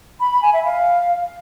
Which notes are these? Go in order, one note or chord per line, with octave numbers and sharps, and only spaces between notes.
B5
B5
G#5
E5
F5